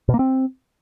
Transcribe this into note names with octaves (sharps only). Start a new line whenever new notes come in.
B2
A#3
C4